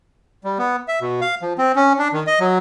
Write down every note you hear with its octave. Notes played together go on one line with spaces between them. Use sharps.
G3
B3
E5
B2
F5
F3
C4
C#4
D4
D#3
D#5
F#3